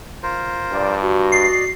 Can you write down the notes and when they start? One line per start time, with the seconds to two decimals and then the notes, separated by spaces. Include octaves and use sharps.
0.23 F4 A#4 C5
0.72 G2 D5
1.02 F#4
1.32 D5 D#5 C7